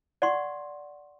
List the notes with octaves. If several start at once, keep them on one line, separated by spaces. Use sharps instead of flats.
D5 F#5 C6 C#6